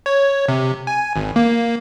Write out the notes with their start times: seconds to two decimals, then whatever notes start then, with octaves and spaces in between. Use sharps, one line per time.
0.06 C#5
0.48 C3
0.87 G#5
1.16 G#1
1.36 A#3